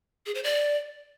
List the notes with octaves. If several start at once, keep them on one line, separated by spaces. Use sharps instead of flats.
G#4
C5
D5